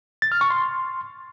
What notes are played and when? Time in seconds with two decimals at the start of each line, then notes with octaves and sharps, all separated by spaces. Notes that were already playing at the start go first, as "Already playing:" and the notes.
0.22 A6
0.32 F6
0.41 C#6
0.50 C6